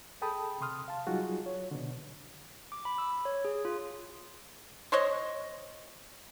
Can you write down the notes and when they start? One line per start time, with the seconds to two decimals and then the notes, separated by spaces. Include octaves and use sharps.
0.22 G#4 A4 G5 A5 B5 D#6
0.61 C3 C6 D#6 F6
0.88 F5 A5
1.07 F#3 G3 D#4 F4 F#4 G#4
1.46 C#5
1.71 B2 D3
2.72 D6
2.85 B5
2.98 E6
3.25 C#5
3.45 G#4
3.65 F4
4.92 C5 C#5 D#5